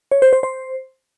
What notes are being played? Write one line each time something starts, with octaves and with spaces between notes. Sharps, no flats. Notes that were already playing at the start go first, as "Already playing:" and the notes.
C#5
C5
C5
C5